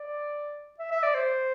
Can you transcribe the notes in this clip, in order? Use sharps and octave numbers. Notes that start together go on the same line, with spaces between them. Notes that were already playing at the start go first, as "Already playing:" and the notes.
Already playing: D5
E5
E5
D5
C5